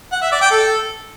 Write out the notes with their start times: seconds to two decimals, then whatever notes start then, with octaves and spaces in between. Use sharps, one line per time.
0.13 F#5
0.22 E5
0.32 D5
0.41 G5
0.51 A4